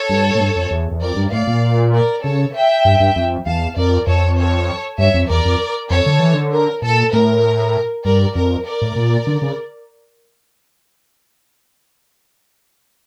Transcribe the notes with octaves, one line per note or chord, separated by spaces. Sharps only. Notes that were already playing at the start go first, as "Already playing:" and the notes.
Already playing: A4 C#5
G2
A2
G2
F2
E2
E2
F2 A#4 D5
G2
A2 D5 F5
A#2
A#4 D5
C#3 A4 C#5
E5 G5
G2
G2
F2
E2 F5 A5
F2 A#4 D5
F2 A4 C#5
A4 C#5
G2 C#5 E5
F2
E2 A#4 D5
F2
F2 A4 C#5
D3
E3
D3
A#4
A#2 A4
A2 A#4
G2 A#4 D5
F2 A#4
A#4 D5
A2
A#2
D3
C#3